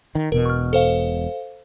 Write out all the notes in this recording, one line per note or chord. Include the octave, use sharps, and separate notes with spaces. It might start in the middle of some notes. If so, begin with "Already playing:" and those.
D#3
E1 B2 A#4
C#6 F6
A4 C5 F5